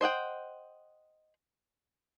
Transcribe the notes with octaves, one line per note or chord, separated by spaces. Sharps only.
C5 D#5 F#5 G5